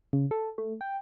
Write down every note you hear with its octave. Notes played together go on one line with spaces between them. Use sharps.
C#3
A4
A3
G5